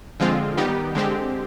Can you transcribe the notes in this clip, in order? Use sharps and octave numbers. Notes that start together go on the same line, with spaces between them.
D3 F3 G#3 C4 F4
D#3 G3 B3 D#4 G4
D3 G#3 C4 G4